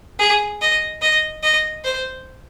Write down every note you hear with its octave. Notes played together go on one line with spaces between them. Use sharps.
G#4
D#5
D#5
D#5
C5